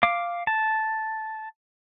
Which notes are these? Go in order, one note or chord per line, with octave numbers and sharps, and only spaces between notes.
F5 D6
A5